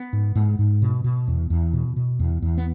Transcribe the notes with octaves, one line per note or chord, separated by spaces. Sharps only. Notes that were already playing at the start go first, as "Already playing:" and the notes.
Already playing: B3
G#2
G#2
G#2
B2
B2
E2
E2
B2
B2
E2
E2
B3